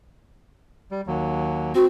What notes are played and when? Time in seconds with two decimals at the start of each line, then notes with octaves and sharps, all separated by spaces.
0.91 G3
1.07 D#2 F#3
1.75 C4 F#4